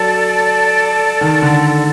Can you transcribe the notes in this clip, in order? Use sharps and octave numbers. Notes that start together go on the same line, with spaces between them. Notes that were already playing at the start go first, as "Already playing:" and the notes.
Already playing: F#3 A4 D5 A5
D#3
D3